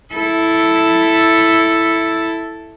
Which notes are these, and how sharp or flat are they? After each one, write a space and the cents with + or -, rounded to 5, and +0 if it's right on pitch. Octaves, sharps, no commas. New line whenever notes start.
E4 +0 A4 +0